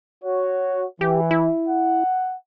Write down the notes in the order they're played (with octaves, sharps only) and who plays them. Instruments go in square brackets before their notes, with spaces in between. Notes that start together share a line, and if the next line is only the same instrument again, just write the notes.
[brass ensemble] F#4 C#5
[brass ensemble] E3 [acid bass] G4
[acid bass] E4
[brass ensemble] F#5